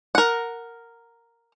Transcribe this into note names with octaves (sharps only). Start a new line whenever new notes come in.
A#4 F#5